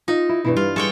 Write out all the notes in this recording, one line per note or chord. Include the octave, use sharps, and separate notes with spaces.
D#4 F4
E4
G2 B2 E3 E4
G3 F4
G#3 A4 C#5 G5